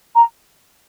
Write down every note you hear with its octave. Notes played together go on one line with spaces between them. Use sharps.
A#5